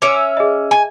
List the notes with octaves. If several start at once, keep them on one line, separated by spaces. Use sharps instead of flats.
C#4 E5 D6 C#7 D7
E6
G#4 D#5
G#5